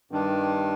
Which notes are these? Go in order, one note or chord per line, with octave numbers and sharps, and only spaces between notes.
G2 D#3 G3 D4